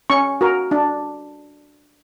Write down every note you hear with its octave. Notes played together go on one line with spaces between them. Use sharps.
C#4 C#6
F#4 A#4
D4